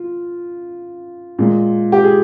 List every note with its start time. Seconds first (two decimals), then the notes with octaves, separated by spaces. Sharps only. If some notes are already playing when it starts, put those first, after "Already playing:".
Already playing: F4
1.39 A#2 G#3
1.92 G4
2.04 G#4